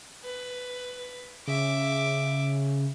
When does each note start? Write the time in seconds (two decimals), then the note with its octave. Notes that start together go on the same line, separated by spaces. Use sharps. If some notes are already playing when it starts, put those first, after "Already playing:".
0.24 B4
1.48 C#3 E5 D6